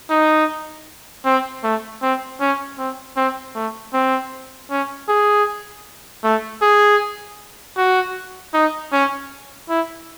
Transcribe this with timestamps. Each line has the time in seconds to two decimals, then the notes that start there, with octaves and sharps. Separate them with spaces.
0.10 D#4
1.25 C4
1.64 A3
2.02 C4
2.40 C#4
2.78 C4
3.17 C4
3.56 A3
3.94 C4
4.70 C#4
5.09 G#4
6.24 A3
6.62 G#4
7.77 F#4
8.54 D#4
8.93 C#4
9.69 E4